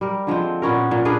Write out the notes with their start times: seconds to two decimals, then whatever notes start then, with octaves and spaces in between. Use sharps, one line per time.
0.01 G3 A#4
0.27 D3 F3 G#3 C4
0.62 A#2 B3 C#4 A#4
0.91 A#2
1.05 D4 G#4 A#4 B4